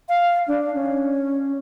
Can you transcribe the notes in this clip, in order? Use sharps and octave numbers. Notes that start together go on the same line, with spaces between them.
F5
D4
C#4